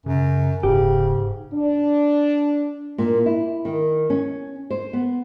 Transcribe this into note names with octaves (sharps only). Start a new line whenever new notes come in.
F#2 C#3
F1 G#2 C#3 G4
D4
A#2
E4
D#3
C#4
C5
B3